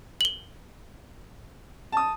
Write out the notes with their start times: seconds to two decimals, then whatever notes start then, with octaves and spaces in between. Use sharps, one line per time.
0.21 F#7 G7
1.92 A5 D#6